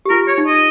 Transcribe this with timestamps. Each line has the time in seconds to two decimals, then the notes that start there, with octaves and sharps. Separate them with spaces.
0.05 G4
0.10 F4 A#4
0.28 C#5
0.38 D#4
0.47 D#5